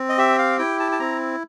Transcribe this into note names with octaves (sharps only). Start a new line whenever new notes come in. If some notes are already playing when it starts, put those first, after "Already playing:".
Already playing: C4
D#5
G4 E5
F5
E4 G5
A5
A5
C4 A#5